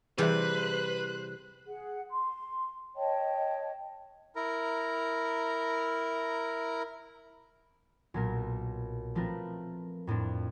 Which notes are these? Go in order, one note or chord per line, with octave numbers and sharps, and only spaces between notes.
C3 E3 G3 G#4 B4 C5 E5 F#6
G#4 F#5
C6
C#5 D#5 G5 A5
E4 A#4 A#5
B1 A#2 A#4
F3 A3 C4 F4 A#4 B4
F2 A2 C4 D4